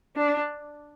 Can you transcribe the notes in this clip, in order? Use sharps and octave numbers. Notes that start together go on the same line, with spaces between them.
D4